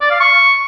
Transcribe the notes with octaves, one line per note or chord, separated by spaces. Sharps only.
D5
F5
C#6